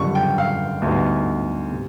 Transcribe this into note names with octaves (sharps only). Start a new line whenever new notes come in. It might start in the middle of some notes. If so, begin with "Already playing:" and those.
Already playing: F#1 F2 D3 G3 C#6
G5
F5
D2 D3 G3 B3 D#4
C3